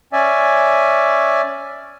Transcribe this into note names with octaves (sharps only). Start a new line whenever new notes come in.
C#4 D5 E5 G#5